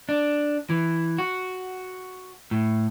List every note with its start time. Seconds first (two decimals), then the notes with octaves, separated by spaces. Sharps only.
0.09 D4
0.70 E3
1.18 F#4
2.51 A2